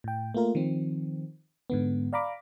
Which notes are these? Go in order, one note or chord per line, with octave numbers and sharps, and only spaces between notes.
A2 G5
A3 A#3 F4 A#4
D#3 F3 C4
G#2 D3 B3
D5 F5 A#5 B5 D6